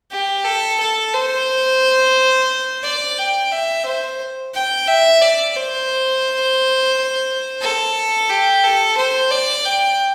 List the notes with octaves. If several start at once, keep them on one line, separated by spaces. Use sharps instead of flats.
G4
A4
A4
C5
D5
G5
E5
C5
G5
E5
D5
C5
A4
G4
A4
C5
D5
G5